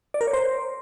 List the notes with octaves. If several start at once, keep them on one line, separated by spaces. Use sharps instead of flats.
D5
A#4
C#5
C5